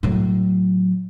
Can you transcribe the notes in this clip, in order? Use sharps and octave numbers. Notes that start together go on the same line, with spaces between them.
A2 F#3